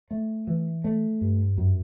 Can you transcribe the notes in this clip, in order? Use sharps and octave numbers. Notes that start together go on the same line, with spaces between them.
A3
E3
A3
G2
F#2